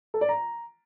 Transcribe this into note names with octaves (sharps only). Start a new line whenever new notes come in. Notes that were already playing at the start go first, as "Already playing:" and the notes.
A4
D5
A#5